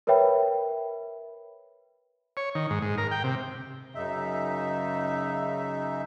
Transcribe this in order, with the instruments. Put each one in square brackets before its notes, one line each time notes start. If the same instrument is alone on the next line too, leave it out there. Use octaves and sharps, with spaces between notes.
[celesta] A#4 B4 C#5 E5 G5 B5
[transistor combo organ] C#5
D#3
G#2
G#2
A#4
G5
C3
[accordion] F#2 C#3 D#4 E5